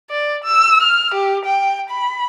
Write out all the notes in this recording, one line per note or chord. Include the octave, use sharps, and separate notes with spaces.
D5
E6
F6
G4
G5
B5